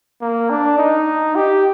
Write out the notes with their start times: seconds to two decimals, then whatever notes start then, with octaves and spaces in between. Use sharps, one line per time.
0.21 A#3
0.50 D4
0.78 D#4
1.36 G4